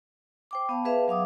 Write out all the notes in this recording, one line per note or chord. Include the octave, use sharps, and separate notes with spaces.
C5 G5 D6
B3 F5 A5
G#4 B4 E5 F5 A5
F#3 F5 D6 D#6